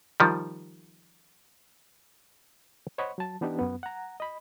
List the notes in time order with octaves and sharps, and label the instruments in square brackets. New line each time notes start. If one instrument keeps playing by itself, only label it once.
[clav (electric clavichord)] D#3 F3 G3
[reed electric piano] C5 C#5 D#5 F#5 B5 C#6
F#3 A5
E3 B3 D4 D#4 G4
F#2 B3
F#5 A#5
D#5 B5